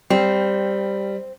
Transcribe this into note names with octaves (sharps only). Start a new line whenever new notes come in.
G3 C4